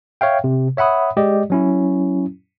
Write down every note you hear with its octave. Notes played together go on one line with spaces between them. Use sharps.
C#5 E5 F5 G5
C3
C#5 E5 F#5 B5 D#6
G#3 G4 D5 D#5
F#3 C#4 E4